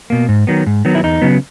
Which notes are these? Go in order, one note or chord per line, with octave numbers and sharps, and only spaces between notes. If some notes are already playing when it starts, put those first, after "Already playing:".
B2 A#3
G#2
D#3 F#3 B3
G#2
D#3 F#3 B3
E4
E2 D#4
C#3 F#3 B3